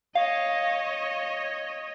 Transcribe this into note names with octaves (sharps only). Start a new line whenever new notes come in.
C#5 D#5 F5